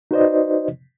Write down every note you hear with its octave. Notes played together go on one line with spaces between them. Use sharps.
D#4 F#4 B4 C5 D5 D#5